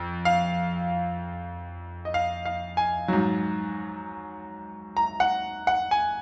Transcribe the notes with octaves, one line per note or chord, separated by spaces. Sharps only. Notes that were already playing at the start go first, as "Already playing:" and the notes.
Already playing: F2
F5
D#5
F5
F5
G#5
G#2 F#3
A#5
F#5
F#5
G#5